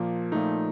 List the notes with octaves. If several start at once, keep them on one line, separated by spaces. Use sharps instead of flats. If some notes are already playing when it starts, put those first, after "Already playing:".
Already playing: A#2 F3 A#3
A#2 F3 A3 D#4